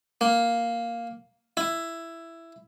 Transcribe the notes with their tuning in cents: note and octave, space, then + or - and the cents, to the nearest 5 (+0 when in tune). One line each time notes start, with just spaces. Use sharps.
A#3 +0
E4 +10